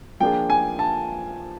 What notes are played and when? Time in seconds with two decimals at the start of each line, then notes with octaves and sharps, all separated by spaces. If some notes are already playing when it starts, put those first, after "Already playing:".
0.20 F3 A#3 D4 F4 G#4 G5
0.50 G#5
0.79 A5